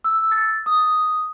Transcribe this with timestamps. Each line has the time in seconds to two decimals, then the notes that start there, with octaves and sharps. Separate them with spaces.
0.04 E6
0.31 A6
0.66 D#6